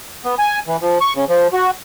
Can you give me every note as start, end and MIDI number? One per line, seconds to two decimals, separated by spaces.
0.25 0.35 59
0.39 0.59 80
0.67 0.77 52
0.81 0.98 53
1.01 1.13 85
1.16 1.25 49
1.29 1.48 53
1.53 1.71 66